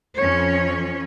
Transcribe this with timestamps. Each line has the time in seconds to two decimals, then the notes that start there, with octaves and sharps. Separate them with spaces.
0.17 F2 F3 C#4 C#5